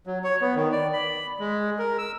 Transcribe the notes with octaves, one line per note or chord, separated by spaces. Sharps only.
F#3
C#5
B3
D#3
D5
B5
G#3
A#4
E6